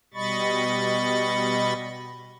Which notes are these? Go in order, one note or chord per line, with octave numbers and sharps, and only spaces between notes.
B2 G3 D#5 B5 C#6 A6